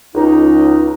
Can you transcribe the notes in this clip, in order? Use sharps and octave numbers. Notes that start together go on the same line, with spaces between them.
C#2 D#4